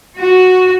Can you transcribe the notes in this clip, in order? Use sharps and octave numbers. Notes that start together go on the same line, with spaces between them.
F#4